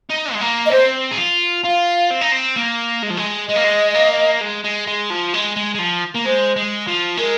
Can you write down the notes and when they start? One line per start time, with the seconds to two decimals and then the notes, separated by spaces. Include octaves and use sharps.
0.10 D#4
0.33 G#3
0.41 A#3
0.66 D#5
0.71 C4 C5
1.11 G#4
1.18 F4
1.64 F4 F5
2.10 C4
2.21 D#4
2.32 C4
2.56 A#3
3.03 G#3
3.10 F3
3.17 G#3
3.48 G#3 D#5
3.56 A#3
3.64 G#3
3.95 A#3
4.41 G#3
4.64 G#3
4.87 G#3
5.10 F3
5.34 G#3
5.57 G#3
5.75 G#3
5.79 F3
6.15 A#3
6.26 G#3 C5
6.56 G#3
6.87 F3
7.17 G#3 A#4